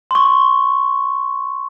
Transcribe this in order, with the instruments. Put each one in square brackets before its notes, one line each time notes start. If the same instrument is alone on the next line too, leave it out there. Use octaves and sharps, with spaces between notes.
[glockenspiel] C6 C#6